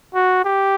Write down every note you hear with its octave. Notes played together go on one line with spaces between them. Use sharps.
F#4
G4